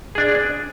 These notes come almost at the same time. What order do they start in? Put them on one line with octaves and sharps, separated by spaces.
G#4 D4 D5